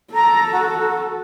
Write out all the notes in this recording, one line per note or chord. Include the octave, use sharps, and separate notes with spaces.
A4 A#5
F#4